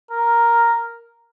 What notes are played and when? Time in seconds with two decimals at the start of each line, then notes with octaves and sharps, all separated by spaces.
0.11 A#4